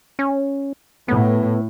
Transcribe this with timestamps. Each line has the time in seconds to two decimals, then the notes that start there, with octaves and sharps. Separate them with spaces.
0.19 C#4
1.08 A2 B3